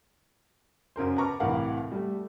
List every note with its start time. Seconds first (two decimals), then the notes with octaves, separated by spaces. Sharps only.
0.96 F#2 C#3 A#4 C5
1.17 B4 A5 A#5 C#6 D6 F6
1.40 C2 A2 E3 A#4 F5 F#5
1.92 G3 A3